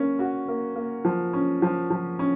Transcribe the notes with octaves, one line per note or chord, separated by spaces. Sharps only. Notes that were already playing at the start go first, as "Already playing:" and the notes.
Already playing: A#3 C#4
F#4
A#3
A#3
F3
C#4
F3
F3
C#4